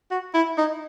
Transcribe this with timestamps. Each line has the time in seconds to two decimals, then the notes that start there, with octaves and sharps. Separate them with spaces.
0.11 F#4
0.34 E4
0.57 D#4